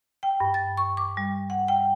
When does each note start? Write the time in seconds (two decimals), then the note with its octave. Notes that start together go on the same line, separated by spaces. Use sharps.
0.23 G5
0.40 G2
0.54 A6
0.77 C#6
0.97 D6
1.17 G3
1.50 F#5
1.68 G5